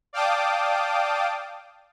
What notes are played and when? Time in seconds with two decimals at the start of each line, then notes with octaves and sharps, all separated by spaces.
0.13 D5 F5 G5 A5 D6 D#6